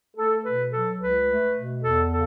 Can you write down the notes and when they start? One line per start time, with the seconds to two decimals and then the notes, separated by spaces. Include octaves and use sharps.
0.16 A3 A4
0.44 B2 B4
0.72 F#3 A4
0.99 C#2 B4
1.27 A3
1.55 B2
1.82 E2 A4
2.10 C#3 A4